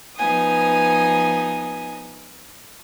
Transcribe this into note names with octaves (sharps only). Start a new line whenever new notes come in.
F3 B3 D#4 G#5 D#6